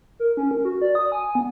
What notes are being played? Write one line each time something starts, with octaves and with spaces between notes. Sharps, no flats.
A#4
C#4
A#4
F#4
D5
D#6
G#5
B3